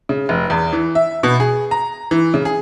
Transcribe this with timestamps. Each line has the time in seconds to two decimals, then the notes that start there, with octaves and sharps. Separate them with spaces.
0.09 C#3
0.29 F1
0.50 E2
0.73 E3
0.95 E5
1.23 B2
1.40 G#4
1.71 A#5
2.11 E3
2.34 C#3
2.45 G#4